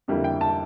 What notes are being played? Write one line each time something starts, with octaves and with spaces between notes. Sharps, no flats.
F2 D3 G3 A#3 E4
G5
A5